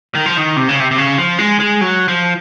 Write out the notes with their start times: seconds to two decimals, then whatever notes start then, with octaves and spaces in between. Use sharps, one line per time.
0.15 D#3
0.26 F3
0.37 D#3
0.57 C3
0.69 C#3
0.80 C3
0.91 C3
0.98 C#3
1.18 F3
1.38 G#3
1.60 G#3
1.81 F#3
2.08 F3